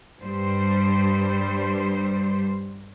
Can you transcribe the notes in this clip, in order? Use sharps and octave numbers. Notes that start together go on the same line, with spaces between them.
G2 G3 C5